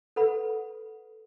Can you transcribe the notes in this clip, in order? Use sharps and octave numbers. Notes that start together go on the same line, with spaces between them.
A4 B4 F#5 B5